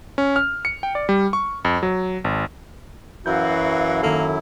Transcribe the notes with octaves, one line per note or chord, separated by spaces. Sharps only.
C#4
F6
C#7
G5
D5
G3
C#6
F2
F#3
G#1
F#2 E3 F#3 E4 F#4 F5 G6
D#3 A#3 A4